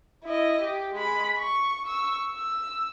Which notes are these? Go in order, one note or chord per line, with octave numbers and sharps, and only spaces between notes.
E4 D#5
G4
G#3 B5
C#6
C#6 E6
E6